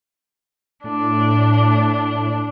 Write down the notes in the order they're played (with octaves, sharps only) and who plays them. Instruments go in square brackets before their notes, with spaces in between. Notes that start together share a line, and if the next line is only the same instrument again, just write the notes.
[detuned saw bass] A2 [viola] D4